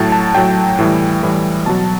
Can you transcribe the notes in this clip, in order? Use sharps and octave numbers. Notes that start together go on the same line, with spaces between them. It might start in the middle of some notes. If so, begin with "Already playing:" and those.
Already playing: A2 F#3 A5
A5
A2 F#3 G5
A2 E3 G3
A2 E3 G3
B2 F#3 A5